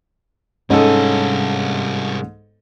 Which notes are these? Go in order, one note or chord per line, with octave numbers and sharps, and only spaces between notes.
C2 G#2 C#4 A4 D#5